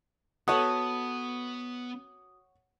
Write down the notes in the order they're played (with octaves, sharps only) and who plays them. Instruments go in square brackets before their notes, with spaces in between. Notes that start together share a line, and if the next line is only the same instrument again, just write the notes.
[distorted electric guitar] B3 [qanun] F#4 A4 B4 [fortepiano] C#5 F#5 [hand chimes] D#6